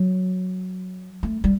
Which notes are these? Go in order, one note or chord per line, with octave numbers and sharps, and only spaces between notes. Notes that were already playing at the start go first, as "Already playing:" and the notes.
Already playing: F#3
A3
G3